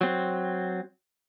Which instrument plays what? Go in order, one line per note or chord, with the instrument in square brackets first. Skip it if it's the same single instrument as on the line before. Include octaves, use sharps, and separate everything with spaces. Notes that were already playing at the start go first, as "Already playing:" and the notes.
[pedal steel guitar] F#3 C4